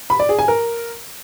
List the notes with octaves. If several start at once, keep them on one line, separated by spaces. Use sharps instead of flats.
B5
D5
G#4
G#5
A#4